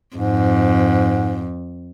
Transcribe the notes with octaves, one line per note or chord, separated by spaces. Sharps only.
F2 G#2